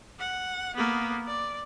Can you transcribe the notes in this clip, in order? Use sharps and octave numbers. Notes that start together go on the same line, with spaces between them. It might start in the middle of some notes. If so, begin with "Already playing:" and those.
F#5
A#3 B3
D5